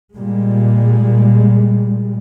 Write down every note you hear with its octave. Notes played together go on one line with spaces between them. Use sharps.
A#2 G3 G#3